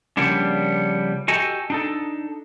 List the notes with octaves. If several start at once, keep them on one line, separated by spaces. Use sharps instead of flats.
C#3 F3 G3 A#3 B3 D4
F#4 G4 A4 D#5 G#5
D4 D#4 A4